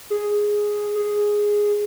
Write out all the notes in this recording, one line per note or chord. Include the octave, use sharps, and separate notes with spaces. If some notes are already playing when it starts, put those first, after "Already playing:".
G#4
G#4